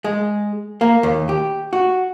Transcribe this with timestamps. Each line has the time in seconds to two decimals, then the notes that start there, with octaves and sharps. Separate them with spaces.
0.04 G#3
0.81 A#3
1.03 D#2
1.29 G4
1.73 F#4